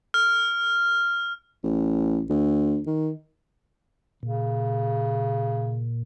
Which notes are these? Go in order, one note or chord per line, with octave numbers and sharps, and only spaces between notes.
F6
A1
D2
D#3
A#2 C#3